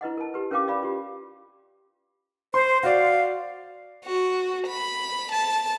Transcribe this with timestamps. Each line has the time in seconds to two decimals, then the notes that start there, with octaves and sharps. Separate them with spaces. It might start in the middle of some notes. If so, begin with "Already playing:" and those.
0.01 E4 B4 D#5 F#5
0.17 A#4 A5
0.34 G4 B4
0.51 C#4 A#4 B4 F5 G5 D6
0.68 D5 F5 B5
0.83 F4 G4
2.54 C5 C6
2.83 F#4 D5 F5
4.05 F#4
4.67 B5
5.32 A5